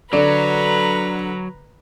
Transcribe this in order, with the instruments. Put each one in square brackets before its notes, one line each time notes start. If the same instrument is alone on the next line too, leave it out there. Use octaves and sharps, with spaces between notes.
[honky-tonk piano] D3 [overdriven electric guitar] F#3 [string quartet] B4 A#5 B5 [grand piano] D5